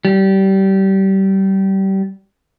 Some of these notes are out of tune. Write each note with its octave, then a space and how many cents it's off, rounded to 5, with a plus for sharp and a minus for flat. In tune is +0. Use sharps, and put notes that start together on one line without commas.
G3 -25